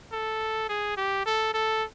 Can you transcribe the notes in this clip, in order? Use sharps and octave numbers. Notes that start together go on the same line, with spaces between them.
A4
G#4
G4
A4
A4